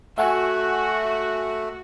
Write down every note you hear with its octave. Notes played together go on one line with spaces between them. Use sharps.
A3 F#4 E5 F#5 G#5